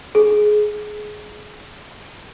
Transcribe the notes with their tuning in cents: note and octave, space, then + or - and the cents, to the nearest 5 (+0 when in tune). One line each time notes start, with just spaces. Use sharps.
G#4 +20